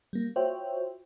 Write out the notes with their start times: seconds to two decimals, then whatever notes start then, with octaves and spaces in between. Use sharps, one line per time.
0.13 G3 A#3
0.36 F4 F#4 C5 C#5 E5 G5